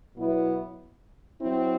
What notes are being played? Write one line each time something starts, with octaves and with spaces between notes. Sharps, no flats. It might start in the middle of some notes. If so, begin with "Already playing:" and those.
B2 F#3 B3 E4
F#3 C4 E4